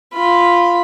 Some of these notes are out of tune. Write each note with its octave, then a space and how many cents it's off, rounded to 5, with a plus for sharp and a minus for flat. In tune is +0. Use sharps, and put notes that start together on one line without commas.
F4 +0 B5 +0